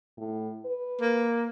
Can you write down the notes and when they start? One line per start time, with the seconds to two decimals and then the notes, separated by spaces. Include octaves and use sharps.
0.18 A2
0.65 B4
1.01 A#3